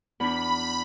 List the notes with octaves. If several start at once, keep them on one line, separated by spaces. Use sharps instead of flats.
E2 D4 B5